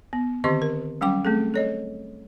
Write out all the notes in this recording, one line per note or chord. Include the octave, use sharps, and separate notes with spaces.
B3
D3 D#3 C4 G4 D#5 C6
A#4
F#3 G3 C#4 G5 D6
A3 C4 G#4 A4
A4 C#5 D#5